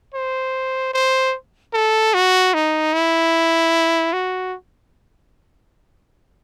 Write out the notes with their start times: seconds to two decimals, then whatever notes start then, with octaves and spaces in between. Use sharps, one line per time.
0.14 C5
0.94 C5
1.73 A4
2.14 F#4
2.54 D#4
2.93 E4
4.13 F#4